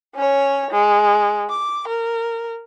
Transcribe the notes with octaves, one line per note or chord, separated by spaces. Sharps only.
C#4 C#5
G#3
D6
A#4